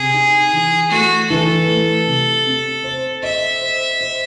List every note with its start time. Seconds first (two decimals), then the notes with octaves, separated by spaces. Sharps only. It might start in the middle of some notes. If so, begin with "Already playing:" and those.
Already playing: C3 G#4
0.14 D#4
0.53 E3
0.90 A3 F#4
1.29 E3 A4
1.68 A3
2.07 C3
2.46 C4
2.84 C5
3.23 D#5 E5
3.62 C5
4.01 C5